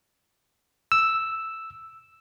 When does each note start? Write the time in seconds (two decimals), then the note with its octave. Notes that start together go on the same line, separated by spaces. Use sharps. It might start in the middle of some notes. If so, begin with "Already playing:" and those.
0.92 E6